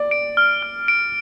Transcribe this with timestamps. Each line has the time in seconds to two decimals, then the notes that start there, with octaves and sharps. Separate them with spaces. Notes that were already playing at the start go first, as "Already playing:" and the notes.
Already playing: D5
0.11 D7
0.37 F6
0.63 F6
0.88 D7